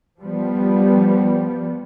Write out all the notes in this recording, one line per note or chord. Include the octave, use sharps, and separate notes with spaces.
F3 G3 B3